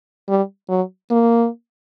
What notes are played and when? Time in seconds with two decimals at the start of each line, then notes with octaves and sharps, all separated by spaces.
0.29 G3
0.69 F#3
1.11 A#3